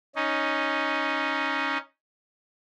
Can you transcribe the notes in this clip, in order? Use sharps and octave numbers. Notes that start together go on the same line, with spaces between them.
C#4 D#4